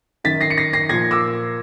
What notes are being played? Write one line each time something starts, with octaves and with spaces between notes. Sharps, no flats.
F#2 D#3 A6 B6
A#6 C7
C#7
A#6 C7
A#6 C7
A#2 F3 G#6 A#6
D6 E6